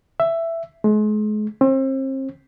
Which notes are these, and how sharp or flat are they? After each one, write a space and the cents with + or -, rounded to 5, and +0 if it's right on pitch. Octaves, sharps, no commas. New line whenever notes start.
E5 +10
G#3 +40
C4 +35